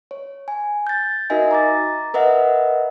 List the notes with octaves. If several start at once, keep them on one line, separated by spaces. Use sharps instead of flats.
C#5
G#5
G6 A6
D#4 F#4 A#4 D#5 E5 G#5
A#5 D6 A6
A#4 B4 D#5 E5 F#5